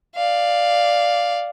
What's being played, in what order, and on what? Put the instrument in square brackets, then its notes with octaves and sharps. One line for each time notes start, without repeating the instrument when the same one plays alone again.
[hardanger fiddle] D5 F5